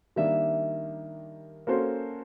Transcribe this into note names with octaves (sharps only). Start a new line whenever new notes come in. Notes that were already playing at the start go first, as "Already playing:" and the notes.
D#3 G3 A#3 D4 E5
A#3 C#4 F#4 A4 C5